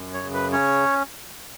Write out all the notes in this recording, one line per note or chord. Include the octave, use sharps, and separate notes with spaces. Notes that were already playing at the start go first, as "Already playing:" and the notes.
Already playing: F#2
C#5
C#3
B4
C#4 C#5